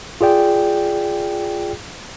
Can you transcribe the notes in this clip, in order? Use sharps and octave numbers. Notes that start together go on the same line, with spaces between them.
F4 G#4 D5 G5